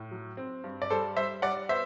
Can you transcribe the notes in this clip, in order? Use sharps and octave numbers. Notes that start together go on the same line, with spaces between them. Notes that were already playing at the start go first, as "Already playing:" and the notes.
Already playing: A2
F#3
C4
G2
D5
G3 A4 C5
G3 C5 E5
G3 D5 F#5
B3 C5 E5